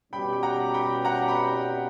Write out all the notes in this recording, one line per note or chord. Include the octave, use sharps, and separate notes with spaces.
B2 G3 C#4 G4 G5 B5
G5
F#5 A#5
G5 B5
F#5 A#5
G5 B5